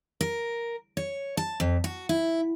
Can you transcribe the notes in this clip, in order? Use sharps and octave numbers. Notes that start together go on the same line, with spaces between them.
A#4
C#5
A5
F2
F#4
E4